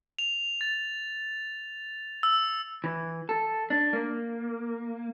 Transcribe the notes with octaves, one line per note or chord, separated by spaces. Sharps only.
F7
A6
E6
E3
A4
D4
A#3